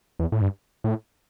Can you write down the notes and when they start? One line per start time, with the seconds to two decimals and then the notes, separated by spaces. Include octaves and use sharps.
0.19 E2
0.32 A2
0.41 G2
0.84 A2